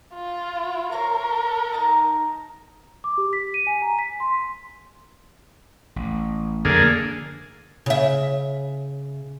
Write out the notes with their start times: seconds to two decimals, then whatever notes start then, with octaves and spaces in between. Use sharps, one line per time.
0.14 F4
0.92 A#4 C5 C#5 A#5
1.73 D#4 A5 A#5
3.04 D6
3.18 G4
3.33 B6
3.54 D#7
3.67 G#5
3.82 A#5
3.99 B6
4.20 C6
5.96 A1
6.65 F2 D3 E3 F#3 A#3 G#4
7.86 C#3 E5